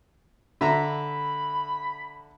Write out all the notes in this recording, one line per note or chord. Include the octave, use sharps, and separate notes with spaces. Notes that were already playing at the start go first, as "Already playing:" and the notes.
D3 E5 A#5 B5